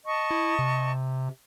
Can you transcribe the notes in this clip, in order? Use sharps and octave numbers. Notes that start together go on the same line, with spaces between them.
D#5 A5 C#6
E4
C3